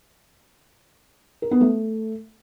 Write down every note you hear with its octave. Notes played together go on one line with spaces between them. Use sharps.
A#4
B3
A3